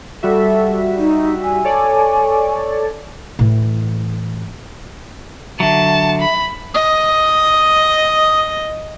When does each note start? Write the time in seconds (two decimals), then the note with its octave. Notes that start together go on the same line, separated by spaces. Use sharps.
0.23 G3 F#4 A4 E5
0.98 D#4
1.43 G#5
1.64 A4 C#5 D5
3.39 A2 E3
5.60 D3 F#3 E5 A5
6.21 B5
6.74 D#5 D#6